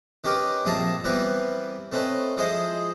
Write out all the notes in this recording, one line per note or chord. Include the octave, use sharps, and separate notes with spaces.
D#3 C#4 G4 A#4 B4
A#1 C4 G#4 E5 A5 A#5
E3 G3 B3 C4 A#4 B4
A3 C4 C#4 D#4 B4
F3 G#3 E4 G#4 C5 D#5